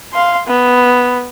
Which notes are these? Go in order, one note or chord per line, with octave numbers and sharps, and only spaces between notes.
F5 C6
B3